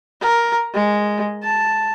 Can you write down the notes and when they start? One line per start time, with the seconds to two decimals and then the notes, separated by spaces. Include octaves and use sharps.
0.21 A#4
0.75 G#3
1.44 A5